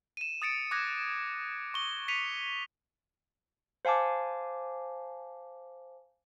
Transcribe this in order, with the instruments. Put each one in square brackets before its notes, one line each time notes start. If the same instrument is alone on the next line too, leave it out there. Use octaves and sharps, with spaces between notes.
[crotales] D#7 E7
D#6 A6 C#7 D7
D6 D#6 F#6 G#6 A#6
C#6 G7
B6 C#7 D#7 F7
[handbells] C5 F5 G#5 A5 D6